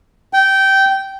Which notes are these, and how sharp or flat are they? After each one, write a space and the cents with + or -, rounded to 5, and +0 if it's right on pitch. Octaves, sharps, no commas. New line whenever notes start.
G5 -15